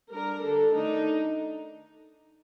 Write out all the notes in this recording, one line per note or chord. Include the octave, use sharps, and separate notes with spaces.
G3 D4 A#4
D3 G3 D4 A4
D#3 A3 D4 D#4